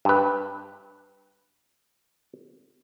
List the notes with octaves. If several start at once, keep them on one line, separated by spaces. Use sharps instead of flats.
G2 B4